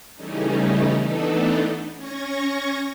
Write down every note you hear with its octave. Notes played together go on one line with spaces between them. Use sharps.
C#3 E3 G3 A3 C#4 D#4
E3 A3 B3 D4 D#4 A4
C#4 C#6 G#6 A#6